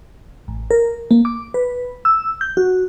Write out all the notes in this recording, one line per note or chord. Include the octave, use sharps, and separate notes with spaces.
A1
A#4
A#3
D6
B4
E6
G6
F#4